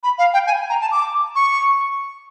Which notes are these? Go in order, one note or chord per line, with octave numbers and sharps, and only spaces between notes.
B5
F5
G5
G#5
A#5
A5
D6
C#6